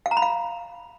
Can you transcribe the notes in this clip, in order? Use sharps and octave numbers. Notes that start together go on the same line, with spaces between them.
F5
A#5
B5
F5